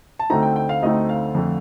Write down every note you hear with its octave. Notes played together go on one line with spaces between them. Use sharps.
A5
D2 D3 A3 C4 D#4 A#5
G5
G5
F5
D2 D3 A3 C4 D#4 D#5
F5
F2 D3 A3